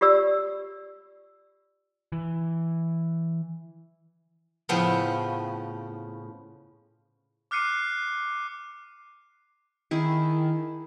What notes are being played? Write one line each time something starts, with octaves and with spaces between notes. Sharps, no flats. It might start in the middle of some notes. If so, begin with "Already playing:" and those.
F4 G4 D5 E6
E3
A2 C#3 F3 B3 C4
D6 F6 F#6 C7 C#7 D#7
D#3 E4 G#4